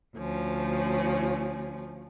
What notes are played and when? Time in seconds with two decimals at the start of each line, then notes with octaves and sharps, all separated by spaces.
0.16 D2 F3 C#4